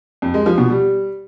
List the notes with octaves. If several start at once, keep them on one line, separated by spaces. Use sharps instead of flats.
F2
G#3
F3
B2
G3